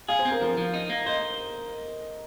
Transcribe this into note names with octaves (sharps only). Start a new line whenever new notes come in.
G#4 F5
C5
C4
A#4
F3 A#4
F3
D#4
A#3
C5 D#5